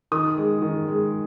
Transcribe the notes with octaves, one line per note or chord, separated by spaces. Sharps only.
D#3 D#6
G#3
D#3
G#3